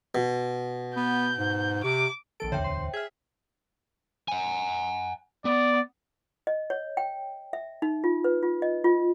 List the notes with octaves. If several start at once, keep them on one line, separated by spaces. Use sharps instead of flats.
B2
B3 G6
G#2
C3 D6
A#1 D#3 A4 D7
D1 E2 D3 C5 C#5 E5 G5
C6
G#4 E5 F6 G#6
F#5 G#5
B3 D5
D#5
C#5
G5
E5
D#4
F4
B4
F4
D#5
F4